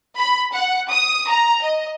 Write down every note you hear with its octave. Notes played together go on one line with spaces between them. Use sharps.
B5
F#5
D#6
A#5
D#5